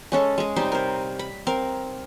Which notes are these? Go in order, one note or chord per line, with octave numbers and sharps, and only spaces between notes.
G#3 C#4 A4
G#3 G#4
C3 G3 D#4 C5
A#4 C5
B5
C4 A#4 F5